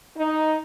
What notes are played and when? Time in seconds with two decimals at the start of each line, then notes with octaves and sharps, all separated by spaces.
0.18 D#4